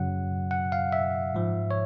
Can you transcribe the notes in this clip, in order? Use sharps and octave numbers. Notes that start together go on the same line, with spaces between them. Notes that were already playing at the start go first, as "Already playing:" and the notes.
Already playing: F#2 C#3 F#3 F#5
F#5
F5
E5
G#2 F3
C#5